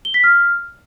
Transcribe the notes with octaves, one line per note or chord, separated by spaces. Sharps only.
G7
B6
F6